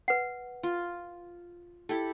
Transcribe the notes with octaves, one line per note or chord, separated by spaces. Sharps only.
B4 F#5
F4
E4 G4 A4